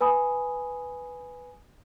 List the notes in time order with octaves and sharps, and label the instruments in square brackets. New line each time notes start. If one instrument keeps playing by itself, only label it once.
[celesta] B4 G#5 B5 D#6